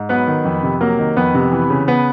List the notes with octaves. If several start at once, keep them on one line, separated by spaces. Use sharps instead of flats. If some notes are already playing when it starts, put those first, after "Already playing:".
Already playing: G#2
F#3 B3 B4
D#3
F2
C3
F#3 A#3 A#4
D#3
F2 B3 B4
C3
E3
C#3
B3 B4